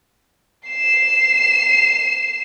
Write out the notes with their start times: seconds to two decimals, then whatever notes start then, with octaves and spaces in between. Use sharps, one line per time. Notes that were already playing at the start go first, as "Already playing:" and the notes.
0.69 C7 E7